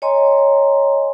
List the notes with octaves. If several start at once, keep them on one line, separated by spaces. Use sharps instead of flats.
C#5 D#5 G#5 A#5 C6